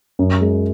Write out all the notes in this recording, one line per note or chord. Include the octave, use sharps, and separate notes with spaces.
F#2
G#3